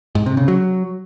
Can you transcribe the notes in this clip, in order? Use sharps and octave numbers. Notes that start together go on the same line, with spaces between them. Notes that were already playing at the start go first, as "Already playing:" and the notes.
G#2
C3
C#3
F#3